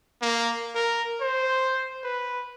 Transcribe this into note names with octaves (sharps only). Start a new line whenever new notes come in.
A#3
A#4
C5
B4